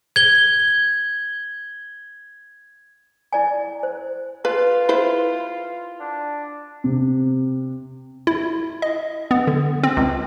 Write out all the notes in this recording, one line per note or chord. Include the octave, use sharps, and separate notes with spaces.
G#6 G7
E4 D5 G#5
C5
F4 B4
E4 B4 C5
D4
C3
E4
D#5
B3
D3
C4
C#2